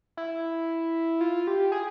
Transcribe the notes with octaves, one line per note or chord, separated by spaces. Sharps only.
E4
F4
G4
G#4